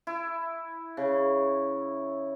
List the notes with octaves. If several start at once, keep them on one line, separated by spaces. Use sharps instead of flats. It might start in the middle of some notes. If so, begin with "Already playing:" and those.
E4
C#3